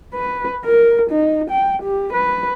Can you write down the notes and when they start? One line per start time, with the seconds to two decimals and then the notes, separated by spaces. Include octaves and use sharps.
0.14 B4
0.65 A#4
1.10 D#4
1.50 G5
1.82 G4
2.13 B4